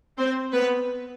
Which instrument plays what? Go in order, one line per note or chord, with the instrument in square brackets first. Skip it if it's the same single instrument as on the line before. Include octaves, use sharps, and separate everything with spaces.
[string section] C4 C5
B3 B4